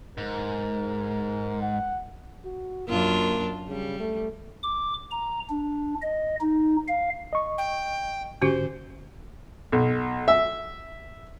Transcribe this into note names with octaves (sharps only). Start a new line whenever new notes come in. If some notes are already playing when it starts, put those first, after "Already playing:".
G#2 A#4
F#5
F#4
F#2 A#3 D4 F4
C#3 G3
A3
D6
A#5
D4
D#5
D#4
F5
D#5 C#6
G5
G#2 D3 C#4 F#4 G4 C5
B1
E5